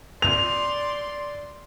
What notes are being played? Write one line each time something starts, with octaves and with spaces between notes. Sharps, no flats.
D5 C6 F7